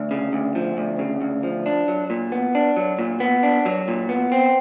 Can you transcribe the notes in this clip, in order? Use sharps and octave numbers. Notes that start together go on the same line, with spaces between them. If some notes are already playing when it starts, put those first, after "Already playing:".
Already playing: D2
C#3
D2
F3
D2
C#3
D2
F3
D4
F#3
A#2
B3
D4
F#3
A#2
B3
D4
F#3
A#2
B3
C4